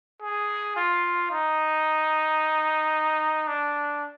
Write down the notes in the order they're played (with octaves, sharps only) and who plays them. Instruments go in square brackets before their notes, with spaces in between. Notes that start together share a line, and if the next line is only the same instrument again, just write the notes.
[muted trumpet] G#4
F4
D#4
D4